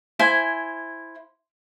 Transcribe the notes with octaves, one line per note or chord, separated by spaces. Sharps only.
E4 C5 G#5